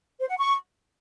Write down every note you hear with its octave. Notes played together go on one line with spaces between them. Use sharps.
C5
F#5
C#6